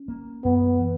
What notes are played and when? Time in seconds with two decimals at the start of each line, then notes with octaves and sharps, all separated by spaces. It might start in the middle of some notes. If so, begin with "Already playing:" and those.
Already playing: C#4
0.08 A#3
0.44 F#2 B3
0.80 E3